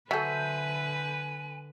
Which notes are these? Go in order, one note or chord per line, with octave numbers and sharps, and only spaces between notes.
D3 F#3 A4 B4 C5 E5 G#5